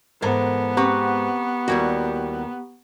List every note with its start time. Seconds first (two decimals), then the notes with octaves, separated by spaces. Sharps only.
0.22 G#2 E3 B3 A4 A#4
0.77 C4 G4 B4 F#5 A#5 C#6
1.68 D#2 G3 E4 F#4